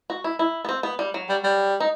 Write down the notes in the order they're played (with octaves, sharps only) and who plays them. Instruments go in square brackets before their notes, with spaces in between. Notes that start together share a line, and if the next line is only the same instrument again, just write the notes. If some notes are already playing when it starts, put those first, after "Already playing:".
[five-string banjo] F#4
E4
E4
B3
C4
B3
G3
F#3
[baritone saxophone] G3
G3
[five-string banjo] D#4